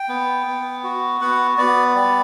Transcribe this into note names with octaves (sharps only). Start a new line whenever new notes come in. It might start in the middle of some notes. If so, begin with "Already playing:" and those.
Already playing: G5
B3
B3
F#4
B3 F#5
B3 D5
G3 D5